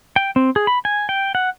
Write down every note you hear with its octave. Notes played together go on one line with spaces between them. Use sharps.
G5
C4
G#4
B5
G#5
G5
F#5